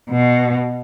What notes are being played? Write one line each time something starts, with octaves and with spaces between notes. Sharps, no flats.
B2